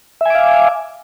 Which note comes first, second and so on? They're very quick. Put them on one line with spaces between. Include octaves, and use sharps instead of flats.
E5 G#5 D6 F5